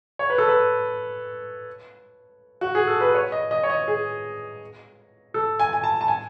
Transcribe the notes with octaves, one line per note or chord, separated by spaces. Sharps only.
C#5
B4
A4
B4
F#4
G#4
A4
B4
C#5
D#5
D#5
C#5
D#5
G#4
A4
G#5
G#5
A5
A5
G#5